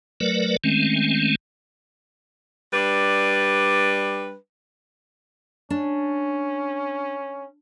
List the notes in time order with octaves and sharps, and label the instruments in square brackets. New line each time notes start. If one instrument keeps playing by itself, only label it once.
[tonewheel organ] F#3 A3 A#4 B4 D5
D#3 G#3 A3 C4 C#4
[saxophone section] G3 D4 B4
[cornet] C#4 [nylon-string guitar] D4